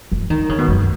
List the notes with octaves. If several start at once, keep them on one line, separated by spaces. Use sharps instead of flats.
E3
D#3
C#3
B2
F#2